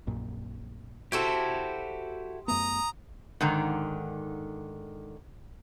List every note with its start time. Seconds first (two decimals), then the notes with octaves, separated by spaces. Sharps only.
0.07 A#1 F#2 A#2
1.12 E4 F#4 G4 A4 C5
2.48 F#2 A3 B3 A#5 D#6
3.41 G#2 D3 D#3